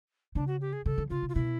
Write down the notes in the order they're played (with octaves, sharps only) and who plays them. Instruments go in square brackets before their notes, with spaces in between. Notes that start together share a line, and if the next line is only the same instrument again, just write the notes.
[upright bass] C#3 [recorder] D4
[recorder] F#4
G4
G#4
[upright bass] C#3 [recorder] A4
[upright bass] D3
[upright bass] C#3 [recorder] F4
[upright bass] C3
[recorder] F4
[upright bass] B2 [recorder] E4